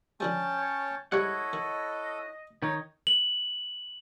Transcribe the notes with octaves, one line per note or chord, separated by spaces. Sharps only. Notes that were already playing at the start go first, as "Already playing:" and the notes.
D3 F3 G#3 C#4 G5 A5
C#5
G#2 G3 E4 A4 C#5 D#5 F#5
D#3
D#3 D#4 C#5
F#7